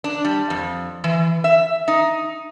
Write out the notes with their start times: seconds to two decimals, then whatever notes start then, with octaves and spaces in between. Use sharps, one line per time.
0.04 D4
0.25 G3
0.50 F2
1.04 E3
1.44 E5
1.88 D#4